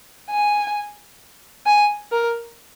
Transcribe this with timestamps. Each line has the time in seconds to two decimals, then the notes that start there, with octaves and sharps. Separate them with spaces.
0.30 G#5
1.66 G#5
2.12 A#4